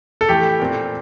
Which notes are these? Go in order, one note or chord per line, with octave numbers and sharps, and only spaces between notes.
A4
A2 E3 A3 G4
A#2 A3 C4